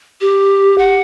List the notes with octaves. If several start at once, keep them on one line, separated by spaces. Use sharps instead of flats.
G4
F#5